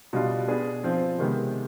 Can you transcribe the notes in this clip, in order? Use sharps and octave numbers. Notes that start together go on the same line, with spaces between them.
B2 G3 D4 F4
B3 D4 G#4
F3 C4 F4 C5
C3 D#3 G#3 B3